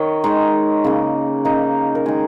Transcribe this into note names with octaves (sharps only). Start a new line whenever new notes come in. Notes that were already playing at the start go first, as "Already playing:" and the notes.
Already playing: D#3 A#4 C#5 D#5
D#3 G#3 D#4
C#3 A#3
C#3 A#3 D#4
A#4
D#3 G#3 G#4